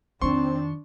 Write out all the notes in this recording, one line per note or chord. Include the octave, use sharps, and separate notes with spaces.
F2 D#3 C4 D4 C6 C#6